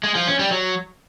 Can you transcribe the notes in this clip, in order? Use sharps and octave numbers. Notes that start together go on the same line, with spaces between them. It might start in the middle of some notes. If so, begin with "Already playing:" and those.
G#3
F3
C#4
G3
F#3